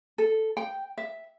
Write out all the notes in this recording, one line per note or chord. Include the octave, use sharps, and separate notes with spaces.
A4
G5
E5